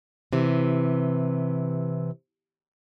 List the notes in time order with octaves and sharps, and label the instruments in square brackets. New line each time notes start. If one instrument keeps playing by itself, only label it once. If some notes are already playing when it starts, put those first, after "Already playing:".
[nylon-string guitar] C3 E3